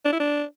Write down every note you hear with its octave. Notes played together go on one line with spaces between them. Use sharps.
D4
E4
D4